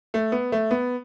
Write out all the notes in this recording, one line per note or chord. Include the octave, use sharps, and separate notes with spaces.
A3
B3
A3
B3